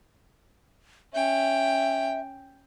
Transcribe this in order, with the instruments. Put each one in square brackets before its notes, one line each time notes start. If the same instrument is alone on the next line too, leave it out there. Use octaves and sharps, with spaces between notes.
[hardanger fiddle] C#4 G5 [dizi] E5